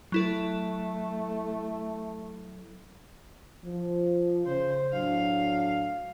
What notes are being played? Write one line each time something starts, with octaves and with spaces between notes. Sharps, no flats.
F#3 A3 E4 A4
F3
C#3 C5
A2 F#3 D4 F5